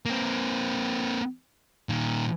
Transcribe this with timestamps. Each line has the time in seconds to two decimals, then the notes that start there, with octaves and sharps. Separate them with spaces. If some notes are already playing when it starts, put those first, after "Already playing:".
0.06 A#3 C4
1.89 A#2 D#3